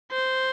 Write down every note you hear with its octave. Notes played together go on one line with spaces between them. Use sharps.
C5